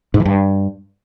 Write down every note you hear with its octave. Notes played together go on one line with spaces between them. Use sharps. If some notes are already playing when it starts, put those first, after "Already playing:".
G#2
E3
G2